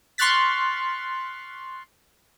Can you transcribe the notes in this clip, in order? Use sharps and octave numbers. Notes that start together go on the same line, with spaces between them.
C6 C#6 F6 F#6 A6 B6